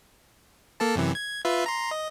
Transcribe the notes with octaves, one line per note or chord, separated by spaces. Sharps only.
A#3 A4 A5
F#2 C3 E3
G#6
F4 B4 E5
A#5 C6
D#5